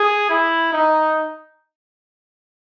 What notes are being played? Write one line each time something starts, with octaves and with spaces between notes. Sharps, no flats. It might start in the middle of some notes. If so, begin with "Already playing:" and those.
Already playing: G#4
E4
D#4